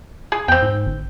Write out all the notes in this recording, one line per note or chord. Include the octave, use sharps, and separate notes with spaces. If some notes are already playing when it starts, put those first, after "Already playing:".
G#4
E2 C4 G5
G#2
G1